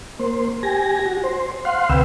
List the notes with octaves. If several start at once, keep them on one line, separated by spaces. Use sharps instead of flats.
A#3 C5
G4 G#5 A#6
F#4
C5
F5 F#5 C6
D2 C3 B4 G5 E6